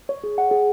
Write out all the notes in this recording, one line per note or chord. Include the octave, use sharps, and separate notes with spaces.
C#5
G#4
F#5
G#4